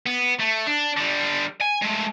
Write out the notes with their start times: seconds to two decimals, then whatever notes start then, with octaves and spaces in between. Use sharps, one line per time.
0.06 B3
0.39 A3
0.67 D4
0.97 D3 G3
1.61 G#5
1.82 G#3 A3